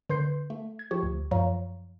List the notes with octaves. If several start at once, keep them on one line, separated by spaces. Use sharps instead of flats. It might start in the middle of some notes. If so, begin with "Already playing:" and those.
D3 B4 C6 G6 C7
A3
G#6
F3 G4 C#6 G#6
D2
F#2 F3 C#5 F5 A#5